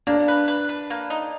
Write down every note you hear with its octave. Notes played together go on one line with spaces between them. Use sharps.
A#3 D4
B4
B4
B4
A#3
D#4